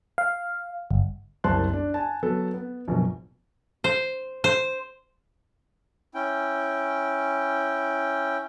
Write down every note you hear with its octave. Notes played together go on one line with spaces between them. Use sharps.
F5
G1
F#1 C2 C5 A5 C6 F#6
D4
G#5 A5
F#3 B3 A4
B3
A#1 F#2 B2
C5
C5
C#4 E4 G5